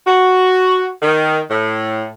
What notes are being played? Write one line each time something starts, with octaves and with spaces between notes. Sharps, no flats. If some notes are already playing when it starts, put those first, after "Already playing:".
F#4
D#3
A2